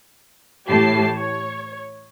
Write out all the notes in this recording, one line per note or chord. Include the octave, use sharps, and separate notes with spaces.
A2 E3 G4 A5 C7
C#5